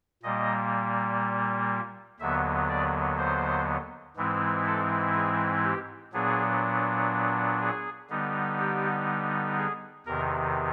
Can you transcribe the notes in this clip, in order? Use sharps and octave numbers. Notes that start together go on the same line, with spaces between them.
A#2 G3 A#3 D#5
D#2 D3 F#3 B3 E5
D5
C5
G#2 E3 G#3 C4 E4
A4
G#4
G4
A#2 F#3 B3 D4 G#4
G#4
D3 G3 B3 D#4
G4
G#4
E2 C3 D#3 A#4